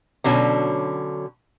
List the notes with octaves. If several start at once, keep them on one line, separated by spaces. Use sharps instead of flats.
B2 D3 F#3 C#4